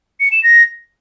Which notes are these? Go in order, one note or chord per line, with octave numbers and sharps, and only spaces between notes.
C#7
E7
A#6